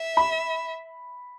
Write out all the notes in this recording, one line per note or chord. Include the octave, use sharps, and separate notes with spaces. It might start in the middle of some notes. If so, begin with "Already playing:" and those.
Already playing: E5
B5